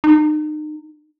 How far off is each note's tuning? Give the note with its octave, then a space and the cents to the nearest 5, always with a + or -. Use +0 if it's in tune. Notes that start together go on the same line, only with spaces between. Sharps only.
D#4 -35